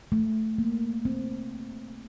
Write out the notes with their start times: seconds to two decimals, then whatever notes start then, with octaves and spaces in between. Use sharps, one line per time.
0.12 A3
0.58 A#3
1.05 C4